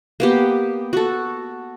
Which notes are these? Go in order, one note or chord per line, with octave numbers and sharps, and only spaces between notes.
A#3 B3 G4
F#4 A4